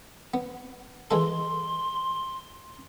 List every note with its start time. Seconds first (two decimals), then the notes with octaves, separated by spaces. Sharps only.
0.34 B3
1.11 E3 G#3 A4 C6